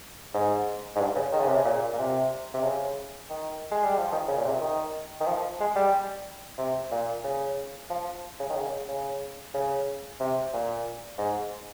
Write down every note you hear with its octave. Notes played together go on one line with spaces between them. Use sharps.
G#2
G#2
G2
C#3
D#3
C#3
C3
C#3
A#2
A#2
C3
C3
C#3
D#3
G#3
G3
F3
D#3
C#3
A#2
C3
D#3
D#3
F3
G#3
G3
C3
A#2
C#3
F3
C#3
D#3
C#3
C#3
C#3
C3
A#2
G#2